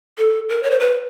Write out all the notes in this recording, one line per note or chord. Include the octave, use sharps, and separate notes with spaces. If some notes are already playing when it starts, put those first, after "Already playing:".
A4
A#4
C#5
C5
B4